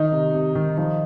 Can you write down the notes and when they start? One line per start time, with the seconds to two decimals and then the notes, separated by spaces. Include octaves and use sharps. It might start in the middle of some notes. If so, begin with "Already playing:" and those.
Already playing: D#3 D#4
0.12 C3
0.34 C3
0.55 D#3
0.77 F3 D#4